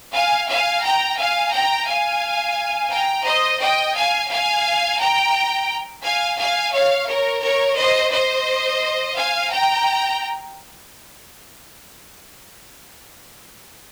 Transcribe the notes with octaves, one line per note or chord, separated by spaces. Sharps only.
F5 G#5
F5 G#5
G5 A#5
F5 G#5
G5 A#5
F5 G#5
G5 A#5
C5 D#5
D#5 G5
F5 G#5
F5 G#5
G5 A#5
F5 G#5
F5 G#5
C#5 F5
A#4 C#5
A#4 C#5
C5 D#5
C5 D#5
F5 G#5
G5 A#5